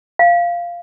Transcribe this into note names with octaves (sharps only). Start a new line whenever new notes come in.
F5